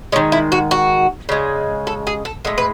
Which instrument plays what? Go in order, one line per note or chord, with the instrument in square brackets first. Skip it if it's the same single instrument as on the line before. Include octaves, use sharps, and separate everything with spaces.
[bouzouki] G#3 C#4
D#3
E4
F#4
F#4
C#3 G#3
A4
G#4
A4
A2 G#3 A4
B4